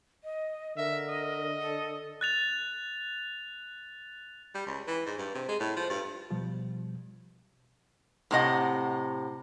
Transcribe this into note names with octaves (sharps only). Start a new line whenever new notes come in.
D#5
D3 A#4 E5
D#5
A4
F#6 A6 F7
G3
C#2
E3
G#2
G2
C3
G#3
A2
F3
G2
B2 F3 G3
A2 C3 D#5 F#5